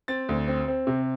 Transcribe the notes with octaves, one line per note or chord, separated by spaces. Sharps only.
C4 A6
D2
C4
C4
C3